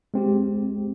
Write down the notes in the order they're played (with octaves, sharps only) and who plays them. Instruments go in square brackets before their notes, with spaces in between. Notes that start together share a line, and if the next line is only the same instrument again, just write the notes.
[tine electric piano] G#3 C4 G4